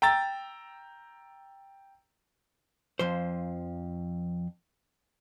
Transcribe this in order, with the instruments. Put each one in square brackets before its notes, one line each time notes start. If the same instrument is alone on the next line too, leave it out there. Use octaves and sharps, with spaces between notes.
[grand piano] G5 A#5 E6 A6
[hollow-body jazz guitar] F2 F3 C5